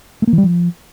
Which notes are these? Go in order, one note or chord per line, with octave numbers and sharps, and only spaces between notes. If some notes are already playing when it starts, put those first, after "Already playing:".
A3
A#3
E3
G3
F3